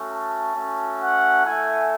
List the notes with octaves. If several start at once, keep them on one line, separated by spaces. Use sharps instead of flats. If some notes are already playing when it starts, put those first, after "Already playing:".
Already playing: A3 C#4 F#4
A5
A3 C#4 F#4
F#5
A3 E4 G#5